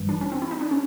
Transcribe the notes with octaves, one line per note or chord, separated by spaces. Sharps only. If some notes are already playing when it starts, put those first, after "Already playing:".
Already playing: A1 G2 E3 G3
D4
C#4
C4
E4
D#4
D4
C#4